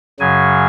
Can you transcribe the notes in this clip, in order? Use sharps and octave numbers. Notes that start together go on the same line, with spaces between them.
F#2 C#3 F#3 G#5